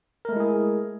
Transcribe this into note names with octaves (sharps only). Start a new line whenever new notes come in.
G#3 A3 E4 G#4 A#4